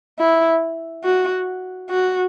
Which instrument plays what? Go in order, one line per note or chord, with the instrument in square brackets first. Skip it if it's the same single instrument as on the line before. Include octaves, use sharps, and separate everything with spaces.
[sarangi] E4
F#4
F#4